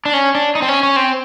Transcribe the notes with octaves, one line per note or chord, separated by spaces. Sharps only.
D4
C#4
D4
D#4
C4
C#4
C#4
C4